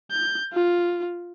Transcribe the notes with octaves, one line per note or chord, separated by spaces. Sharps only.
G6
F4